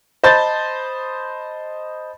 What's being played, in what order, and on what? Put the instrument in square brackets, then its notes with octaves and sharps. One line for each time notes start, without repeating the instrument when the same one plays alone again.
[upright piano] C5 D#5 A5 B5 G6 A6